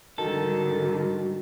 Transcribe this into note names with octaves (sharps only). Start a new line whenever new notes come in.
G#2 D3 D#3 G3 F#4 A4